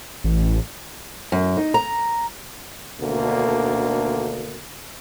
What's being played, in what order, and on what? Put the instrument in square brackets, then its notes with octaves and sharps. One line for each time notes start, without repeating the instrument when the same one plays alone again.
[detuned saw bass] A1
[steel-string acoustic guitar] F#2
D#4
A#5
[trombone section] D2 B2 D3 D#3 A#3